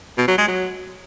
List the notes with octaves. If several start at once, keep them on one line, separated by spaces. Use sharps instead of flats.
B2
F#3
G#3
F#3